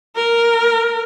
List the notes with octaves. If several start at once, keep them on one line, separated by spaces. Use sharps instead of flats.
A#4